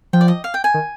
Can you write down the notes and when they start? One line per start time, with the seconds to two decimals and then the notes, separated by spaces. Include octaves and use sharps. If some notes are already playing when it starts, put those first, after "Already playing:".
0.13 F3 G5
0.21 D5
0.28 D#5
0.44 F5
0.54 G5
0.64 G#5
0.74 D#3